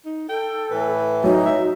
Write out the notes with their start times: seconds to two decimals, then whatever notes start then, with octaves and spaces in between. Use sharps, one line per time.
0.05 D#4
0.29 A4 G5
0.71 A2 E3 B4
1.24 F#3 D#4
1.46 E5